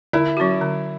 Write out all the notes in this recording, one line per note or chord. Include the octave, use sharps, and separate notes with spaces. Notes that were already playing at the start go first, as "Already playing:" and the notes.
D3 E4
F#3 C#4 F#4
D3